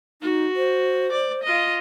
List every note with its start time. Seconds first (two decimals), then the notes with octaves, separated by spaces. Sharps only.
0.22 D#4 F#4
0.56 C5
1.12 D5
1.44 F4 D#5